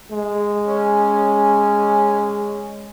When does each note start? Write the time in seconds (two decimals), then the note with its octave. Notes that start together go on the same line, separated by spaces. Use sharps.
0.11 G#3
0.65 C#4